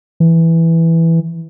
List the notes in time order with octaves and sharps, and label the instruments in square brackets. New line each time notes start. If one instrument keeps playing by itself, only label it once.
[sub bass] E3